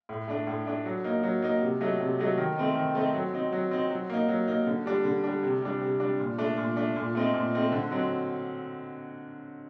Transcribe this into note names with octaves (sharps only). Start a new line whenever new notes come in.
A2
A3 D4
A2
A3 D4
F#3
A#3 D#4
F#3
A#3 D#4
C3
F#3 A3 D#4
C3
F#3 A3 D#4
D#3
A3 C4 D#4
D#3
A3 C4 D#4
F#3
C4 D#4
F#3
C4 D#4
F#3
A#3 D#4
F#3
A#3 D#4
D3
G3 D4
D3
G3 D4
C3
G3 D4
C3
G3 D4
A#2
A3 D4
A#2
A3 D4
A#2
A3 C4 D#4
A#2
A3 C4 D#4
D3
F#3 C4 D#4